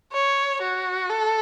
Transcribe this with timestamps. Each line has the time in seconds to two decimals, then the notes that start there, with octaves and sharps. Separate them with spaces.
0.12 C#5
0.61 F#4
1.10 A4